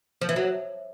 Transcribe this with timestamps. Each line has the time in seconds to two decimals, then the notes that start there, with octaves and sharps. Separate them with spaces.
0.21 F3
0.29 E3
0.36 F#3